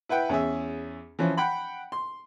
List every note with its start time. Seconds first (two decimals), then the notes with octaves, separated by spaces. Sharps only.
0.09 E4 B4 F#5 G5
0.29 E2 C#4 G#4 E5
1.19 E3 F3 C#4
1.37 F#5 G5 B5
1.92 C6